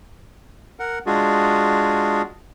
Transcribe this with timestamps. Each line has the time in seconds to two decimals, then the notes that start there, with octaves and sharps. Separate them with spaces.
0.79 A#4 F#5
1.06 G#3 D4 F4 F#4 G#4